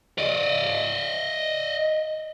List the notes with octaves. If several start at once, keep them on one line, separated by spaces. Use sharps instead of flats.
D5 D#5